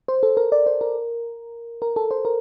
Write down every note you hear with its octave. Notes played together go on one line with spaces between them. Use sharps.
C5
A4
A#4
D5
C5
A#4
A#4
A4
C5
A#4